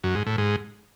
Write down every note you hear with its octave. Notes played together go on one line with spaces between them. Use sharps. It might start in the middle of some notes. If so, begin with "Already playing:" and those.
F#2
G#2
A2
G#2